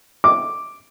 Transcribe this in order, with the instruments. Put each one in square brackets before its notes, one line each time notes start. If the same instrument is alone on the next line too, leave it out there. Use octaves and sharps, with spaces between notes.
[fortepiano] D6